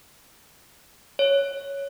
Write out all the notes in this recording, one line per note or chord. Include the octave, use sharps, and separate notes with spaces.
C#5